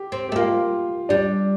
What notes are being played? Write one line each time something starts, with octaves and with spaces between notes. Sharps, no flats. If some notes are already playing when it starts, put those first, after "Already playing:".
Already playing: G4
C4
G4
A3
A#3 F4
G3 D4